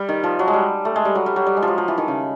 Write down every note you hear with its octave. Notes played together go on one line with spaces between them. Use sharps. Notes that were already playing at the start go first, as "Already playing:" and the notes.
Already playing: G3
D#3
F3
F#3
G#3
G3
A3
G#3
G3
F#3
G3
F#3
G3
G#3
F3
F#3
F3
E3
D#3
C#3